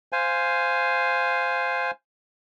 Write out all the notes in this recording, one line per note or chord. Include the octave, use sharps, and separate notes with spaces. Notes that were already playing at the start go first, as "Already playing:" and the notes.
C5 F5 G#5